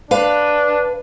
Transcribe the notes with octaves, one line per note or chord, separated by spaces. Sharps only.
D4 B4 F5